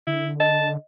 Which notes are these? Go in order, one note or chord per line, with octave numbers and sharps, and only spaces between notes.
D3 E4
D#5 A5